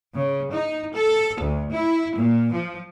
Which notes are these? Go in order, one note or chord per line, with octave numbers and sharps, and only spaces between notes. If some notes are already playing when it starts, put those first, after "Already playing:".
C#3
D#4
A4
D2
E4
A#2
F3